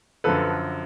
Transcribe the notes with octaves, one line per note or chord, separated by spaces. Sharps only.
F#2 D3 F3 A4 B4